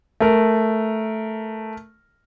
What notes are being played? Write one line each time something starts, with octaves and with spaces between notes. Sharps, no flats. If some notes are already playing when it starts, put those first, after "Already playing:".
A3 A#4